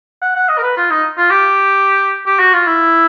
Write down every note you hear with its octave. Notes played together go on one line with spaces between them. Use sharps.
F#5
F#5
D#5
A#4
B4
F4
D#4
F4
G4
G4
F#4
F4
E4